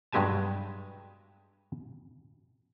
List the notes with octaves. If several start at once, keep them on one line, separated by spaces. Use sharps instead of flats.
G2 F#3 G#3 G4 G#5 A5